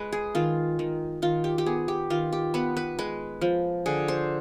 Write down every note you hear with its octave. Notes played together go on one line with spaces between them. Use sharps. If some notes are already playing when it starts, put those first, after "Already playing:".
Already playing: G#3 B4
G#4
D#3 F4
D#3
D#3 F4
G4
G4
B3 G#4
G4
D#3 F4
G4
B3 B4
B4
G#3 B4
F3
D3 G#4
C5